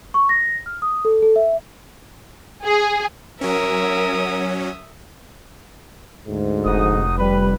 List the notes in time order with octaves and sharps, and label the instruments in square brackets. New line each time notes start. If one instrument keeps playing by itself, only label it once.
[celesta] C#6
A#6
F6
D#6
A4
A4
E5
[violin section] G#4
[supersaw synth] F#3 C#4 [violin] A#4 [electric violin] E5 D#6
[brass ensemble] D2 G#2
[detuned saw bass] F1 [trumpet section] D#4 F#4 D#6
[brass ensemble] G3 [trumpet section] B4